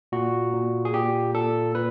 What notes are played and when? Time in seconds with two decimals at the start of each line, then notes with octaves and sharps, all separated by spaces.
0.12 A#2 F#4
0.53 A#2
0.85 G#4
0.94 A#2 G4
1.34 A#2 A4
1.75 A#2 B4